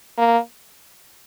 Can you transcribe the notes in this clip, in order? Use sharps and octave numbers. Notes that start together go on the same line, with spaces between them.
A#3